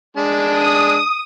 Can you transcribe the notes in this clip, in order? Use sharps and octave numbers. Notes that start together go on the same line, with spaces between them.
G#3 D4 A5
D#6